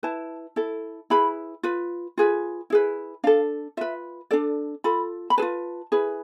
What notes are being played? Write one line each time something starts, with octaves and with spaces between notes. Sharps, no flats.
E4 B4 A5
E4 A4
E4 G#4 B4 B5
F4 B4
F4 G#4 B4
E4 G#4 B4
D4 A4 F5
F4 B4 E5
D4 A4 D5
F4 A4 B5
B5
F4 G#4 B4 A5
E4 G#4 B4